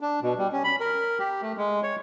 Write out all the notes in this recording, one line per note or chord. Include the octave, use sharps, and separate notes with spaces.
D4
B2
G3
C#4
B5
A#4
G4
A3
G#3
C#5